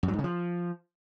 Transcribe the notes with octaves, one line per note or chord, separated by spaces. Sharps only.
F#2
F#3
G#2
C#3
F3